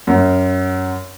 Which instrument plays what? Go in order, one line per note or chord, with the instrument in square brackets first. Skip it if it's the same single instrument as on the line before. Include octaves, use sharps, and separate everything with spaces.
[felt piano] F#2